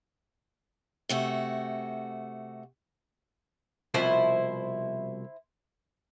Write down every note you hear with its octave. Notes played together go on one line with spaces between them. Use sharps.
C3 A3 F#4
C2 B2 F3 E4 C5